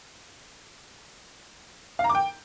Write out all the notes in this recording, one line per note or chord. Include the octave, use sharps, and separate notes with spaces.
F5
A#5
D6
G5